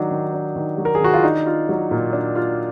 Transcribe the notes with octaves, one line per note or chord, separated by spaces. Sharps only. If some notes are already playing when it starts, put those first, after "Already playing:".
Already playing: D#3 F#3 D4 D#4
D#3
D4
D#3
F#3
A#4
G#4
D#3 F#4
F4
D4 D#4
F4
F#3
A#2
D4
F4